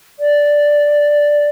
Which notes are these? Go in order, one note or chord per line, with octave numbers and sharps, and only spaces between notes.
D5